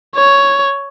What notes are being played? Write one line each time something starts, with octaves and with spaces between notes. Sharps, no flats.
C#5